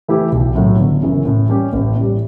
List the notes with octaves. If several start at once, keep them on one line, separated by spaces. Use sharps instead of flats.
E3 A3 E4 G4
B1
A2 F#3 A3
G1
F#2 C#3 E3
A2
G3 C#4 G4
A1
A2
G3